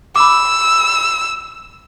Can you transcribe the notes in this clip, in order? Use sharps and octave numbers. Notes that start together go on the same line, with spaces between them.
B5 D6 E6